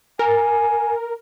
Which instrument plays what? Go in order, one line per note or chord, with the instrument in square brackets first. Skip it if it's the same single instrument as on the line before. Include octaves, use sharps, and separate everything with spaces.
[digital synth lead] A#4 [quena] G#5